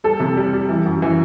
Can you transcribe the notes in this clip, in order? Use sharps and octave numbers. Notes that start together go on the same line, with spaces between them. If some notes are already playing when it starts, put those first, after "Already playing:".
G3 A4
C3
G3
G3
E3
F#2
E3